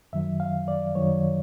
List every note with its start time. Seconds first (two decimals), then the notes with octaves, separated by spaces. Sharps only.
0.13 F#2 D#3 F#3 E5
0.40 F5
0.68 D5
0.95 F#2 D#3 F#3 C#5